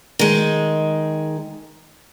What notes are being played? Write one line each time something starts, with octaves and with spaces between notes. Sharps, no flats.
D#3 G#3